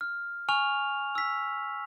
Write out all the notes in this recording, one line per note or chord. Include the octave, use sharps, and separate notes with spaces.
F6
G#5 C#6 F6 F7
E6 B6